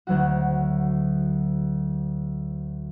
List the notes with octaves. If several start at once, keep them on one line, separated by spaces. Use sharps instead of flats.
D2 F#3 F#4